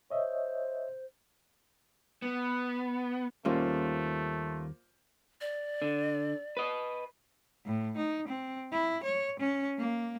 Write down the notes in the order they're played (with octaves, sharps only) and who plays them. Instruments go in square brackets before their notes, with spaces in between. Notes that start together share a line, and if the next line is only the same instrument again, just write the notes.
[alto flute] C5 [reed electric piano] C#5 D#5 E5
[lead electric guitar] B3
[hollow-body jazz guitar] D#2 G3 C#4 [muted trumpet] A3 [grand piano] A#3 F4 C5
[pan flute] D5
[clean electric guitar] D3
B4 D#5
[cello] A2
D#4
C4
E4
C#5
C#4
A#3